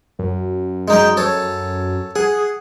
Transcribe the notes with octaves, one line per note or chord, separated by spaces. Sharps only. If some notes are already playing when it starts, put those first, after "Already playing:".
F#2
G#3 D#4 G5
A4 C#5
G#4 F#5